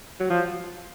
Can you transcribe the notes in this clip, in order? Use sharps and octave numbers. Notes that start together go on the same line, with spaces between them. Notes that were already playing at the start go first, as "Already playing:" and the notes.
F#3
F3